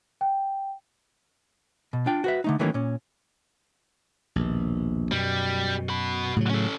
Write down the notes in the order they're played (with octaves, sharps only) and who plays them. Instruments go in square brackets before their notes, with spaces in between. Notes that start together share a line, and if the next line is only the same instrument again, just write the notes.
[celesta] G5
[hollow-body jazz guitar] B2
D4 F4 G5
F#4 B4 E5
D3 A3 D#4
D#3 E3 F#3 A3 A#3 C#4
A#2 C#4
[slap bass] A#1 D#2 B2
[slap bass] F#2 B2 [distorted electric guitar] G3
[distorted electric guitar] F#4 B5
[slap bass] A2 C#3 F#3
[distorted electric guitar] C#4 A4